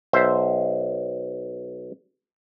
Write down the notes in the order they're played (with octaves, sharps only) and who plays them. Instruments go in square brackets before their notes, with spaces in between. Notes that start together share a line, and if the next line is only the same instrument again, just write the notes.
[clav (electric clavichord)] B1 C5 E5